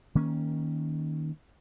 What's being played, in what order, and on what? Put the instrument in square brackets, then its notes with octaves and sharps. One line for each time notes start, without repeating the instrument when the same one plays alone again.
[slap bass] D#3 A#3 C#4